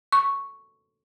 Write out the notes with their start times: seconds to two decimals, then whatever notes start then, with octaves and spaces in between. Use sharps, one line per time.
0.12 C#6